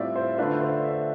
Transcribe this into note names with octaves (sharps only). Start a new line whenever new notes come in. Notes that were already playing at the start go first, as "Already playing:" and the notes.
Already playing: A2 G3 C4 F4 D5 E5
C5
D3 A3 D4 F4 B4
C5
E5